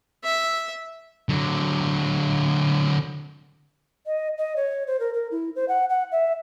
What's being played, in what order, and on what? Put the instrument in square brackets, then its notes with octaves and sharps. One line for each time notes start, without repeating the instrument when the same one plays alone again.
[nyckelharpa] E5
[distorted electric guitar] D3 F#3
[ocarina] D#5
D#5
C#5
C5
A#4
A#4
E4
C5
F#5
F#5
E5